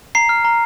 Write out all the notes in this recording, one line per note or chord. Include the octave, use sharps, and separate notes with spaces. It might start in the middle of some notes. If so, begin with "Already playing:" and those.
A#5 C7
F6
A#5